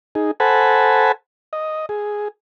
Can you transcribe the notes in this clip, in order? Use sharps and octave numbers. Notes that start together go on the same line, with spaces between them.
D#4 G#4
A4 C5 F#5 G#5 A5 B5
D#5
G#4